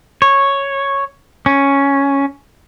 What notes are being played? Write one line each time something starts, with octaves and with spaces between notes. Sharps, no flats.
C#5
C#4